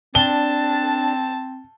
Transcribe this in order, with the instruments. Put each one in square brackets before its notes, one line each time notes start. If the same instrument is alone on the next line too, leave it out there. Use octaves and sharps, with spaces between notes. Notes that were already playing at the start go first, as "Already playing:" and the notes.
[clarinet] C4 [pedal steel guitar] D4 [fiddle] A5 [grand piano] G7